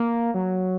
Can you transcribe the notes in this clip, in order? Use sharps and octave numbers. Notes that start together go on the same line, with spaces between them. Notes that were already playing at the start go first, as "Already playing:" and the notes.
Already playing: A#3
F#3